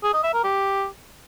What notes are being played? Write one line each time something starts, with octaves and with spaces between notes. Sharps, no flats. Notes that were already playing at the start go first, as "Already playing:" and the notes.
G#4
D#5
E5
A#4
G4